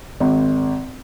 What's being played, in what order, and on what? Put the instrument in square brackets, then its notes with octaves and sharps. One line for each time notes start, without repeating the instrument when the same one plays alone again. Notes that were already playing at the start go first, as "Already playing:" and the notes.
[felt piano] G#1